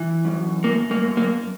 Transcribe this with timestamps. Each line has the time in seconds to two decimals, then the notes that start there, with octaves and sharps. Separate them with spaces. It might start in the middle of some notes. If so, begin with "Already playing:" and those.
Already playing: E3
0.25 F#2
0.64 F#2 A#3
0.91 A#3
1.04 F#2
1.17 A#3